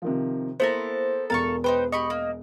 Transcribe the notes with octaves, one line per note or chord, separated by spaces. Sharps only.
C3 D#3 F3
A#3 B3 E4 A4 A#4 C5
E1 E2 A4 A#4 F5 C#6
D#4 B4 C5 G5
G4 D#5 B5 C#6
A#3